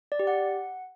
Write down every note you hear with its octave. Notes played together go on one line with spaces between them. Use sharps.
D5
G4
F#5